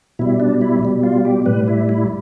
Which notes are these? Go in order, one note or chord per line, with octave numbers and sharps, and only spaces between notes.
B2 G3 E4
D4
E4
B2 G3
F4
G4
A2 G3 B4
E4
E4